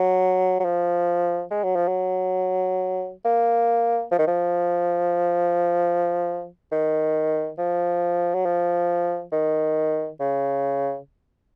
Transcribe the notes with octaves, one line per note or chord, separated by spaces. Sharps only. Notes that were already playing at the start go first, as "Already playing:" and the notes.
Already playing: F#3
F#3
F3
G#3
F#3
F3
F#3
A#3
F3
D#3
F3
D#3
F3
F#3
F3
D#3
C#3